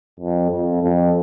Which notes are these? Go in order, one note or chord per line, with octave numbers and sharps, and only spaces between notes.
F2
F2
F2